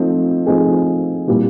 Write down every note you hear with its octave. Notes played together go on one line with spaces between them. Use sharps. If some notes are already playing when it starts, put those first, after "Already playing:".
Already playing: F3 A3 C4 D#4
F3 A3 C4 D#4 G#4
A#2 G3 C4 E4 G4